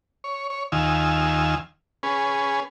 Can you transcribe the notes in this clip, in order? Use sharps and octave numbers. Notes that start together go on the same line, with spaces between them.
C#5
C#5
D#2 D#3 F4 G#5 E6
C#4 G#4 B4